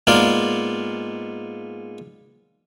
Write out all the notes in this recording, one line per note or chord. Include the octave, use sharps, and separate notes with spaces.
G#2 A#3 B3 F4 D5 F5